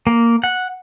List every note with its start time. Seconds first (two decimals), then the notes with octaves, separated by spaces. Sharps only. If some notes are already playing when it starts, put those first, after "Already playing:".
0.07 A#3
0.44 F#5